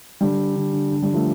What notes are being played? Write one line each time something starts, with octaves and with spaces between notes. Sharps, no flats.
D3 G3
D3
D3
D3
D3 G3
F3 A3